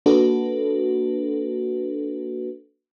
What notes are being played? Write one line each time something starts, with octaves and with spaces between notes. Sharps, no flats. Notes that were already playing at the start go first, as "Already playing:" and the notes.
A#3 D4 F#4 A4 B4